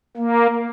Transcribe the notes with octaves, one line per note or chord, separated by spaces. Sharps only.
A#3